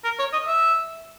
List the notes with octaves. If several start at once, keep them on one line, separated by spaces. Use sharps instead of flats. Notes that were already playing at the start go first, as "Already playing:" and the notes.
A#4
C#5
D#5
E5